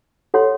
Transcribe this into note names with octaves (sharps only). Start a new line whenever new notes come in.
A4 C#5 F#5 C6